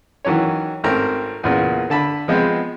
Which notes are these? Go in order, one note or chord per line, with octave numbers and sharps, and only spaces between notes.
D#3 E3 F#3 C#4 C#5
G#1 A3 C4 C#4 A#4 A#5
E2 A#2 C#3
D3 A5 B5
F3 G#3 B3 C4